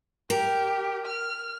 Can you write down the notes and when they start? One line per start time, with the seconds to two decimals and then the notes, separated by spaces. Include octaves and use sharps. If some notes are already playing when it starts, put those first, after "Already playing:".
0.30 G4 A#4
1.05 F6